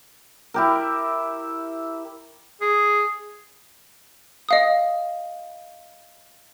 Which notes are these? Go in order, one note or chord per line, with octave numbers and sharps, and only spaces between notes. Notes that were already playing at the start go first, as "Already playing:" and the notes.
E4 G4 A#4
G#4
D#5 F5 D#6